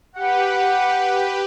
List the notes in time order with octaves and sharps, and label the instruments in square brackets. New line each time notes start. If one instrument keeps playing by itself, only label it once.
[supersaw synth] G4 B4 [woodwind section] F#5